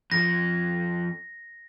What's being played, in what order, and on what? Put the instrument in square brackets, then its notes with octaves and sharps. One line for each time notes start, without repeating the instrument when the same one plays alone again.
[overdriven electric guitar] F2 F3 [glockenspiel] A#6